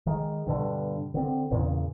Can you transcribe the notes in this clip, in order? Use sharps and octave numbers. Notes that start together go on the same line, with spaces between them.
D#3 G#3
G2 B2 D3
D3 C4
E2 A#2 C#3